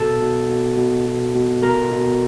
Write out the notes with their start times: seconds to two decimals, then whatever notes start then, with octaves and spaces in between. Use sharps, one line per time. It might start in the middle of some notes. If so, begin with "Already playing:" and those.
Already playing: B2 A4 A5
0.21 B2
0.49 B2
0.77 B2
1.06 B2
1.35 B2
1.63 B2 A#4 A#5
1.91 B2